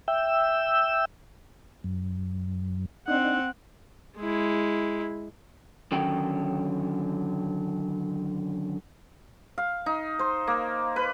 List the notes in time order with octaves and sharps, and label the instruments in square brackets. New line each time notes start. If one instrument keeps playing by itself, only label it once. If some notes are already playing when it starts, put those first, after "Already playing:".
[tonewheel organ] E5 G5 E6
F#2
[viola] C4 F#5 [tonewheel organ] D4 D#4
[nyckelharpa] G#3 E4
[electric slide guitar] D3 D#3 F#3 C#4 G5
[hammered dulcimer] F5
D#4
C5
A#3
B4